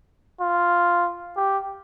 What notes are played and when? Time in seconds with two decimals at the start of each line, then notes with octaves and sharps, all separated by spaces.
0.41 F4
1.37 G4